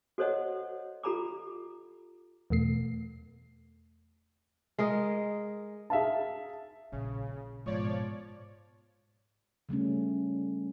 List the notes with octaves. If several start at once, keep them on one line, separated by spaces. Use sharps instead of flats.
F#4 A4 C5 C#5 D#5 F#5
F4 G4 A4 A#5 B5 D6
E2 B2 A3 C7
G#3 A#4 D#5
G#4 E5 F5 A5
A#1 C#3
G#2 B2 F3 C#5 D5
C#3 G3 A3 C#4